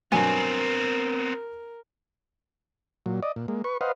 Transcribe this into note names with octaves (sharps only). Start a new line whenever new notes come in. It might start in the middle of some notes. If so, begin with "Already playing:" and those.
G2 B2 F#3 B3 C4 A#4 G#5
A#2 F#3
D5 D#5
A#2
G#3 A#3
B4 C#6
B4 C5 D#5 F5 F#5